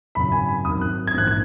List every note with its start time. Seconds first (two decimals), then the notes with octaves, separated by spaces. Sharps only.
0.15 G#1 F#2 C#3 B5
0.32 G#5
0.48 B5
0.65 G#1 F#2 D#3 D#6
0.81 F#6
1.07 G#6
1.14 A#1 G#2 D#3 F#6
1.27 G#6